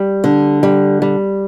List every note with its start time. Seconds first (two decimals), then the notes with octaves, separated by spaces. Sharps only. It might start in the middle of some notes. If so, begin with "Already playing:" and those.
Already playing: G3
0.24 D3
0.63 G3
1.02 G3